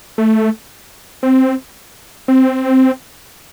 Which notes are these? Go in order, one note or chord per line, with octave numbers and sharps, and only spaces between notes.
A3
C4
C4